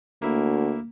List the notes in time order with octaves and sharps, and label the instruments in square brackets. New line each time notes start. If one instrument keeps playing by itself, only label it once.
[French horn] D2 [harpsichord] A#3 E4